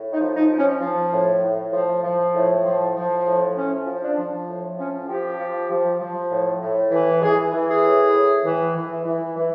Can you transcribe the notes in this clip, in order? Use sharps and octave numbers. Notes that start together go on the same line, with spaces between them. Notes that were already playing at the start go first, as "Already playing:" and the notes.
Already playing: A2
D#4
F3
D#4
F3
C#4
F3
A2
A2
F3
F3
A2
F3
F3
A2
F3 C#4
F3
D4
F3
A2
F3 C#4
F3 G4
F3
F3
F3
A2
A2
E3
E3 G#4
E3
G#4
A2
A2
E3
E3
E3
E3